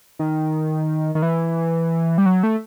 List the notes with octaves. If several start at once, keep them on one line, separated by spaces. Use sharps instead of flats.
D#3
D#3
E3
G3
F#3
A3